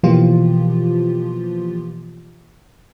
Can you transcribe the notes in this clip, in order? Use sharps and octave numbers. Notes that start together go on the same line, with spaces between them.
B2 E3 F3 A#3 F4 G4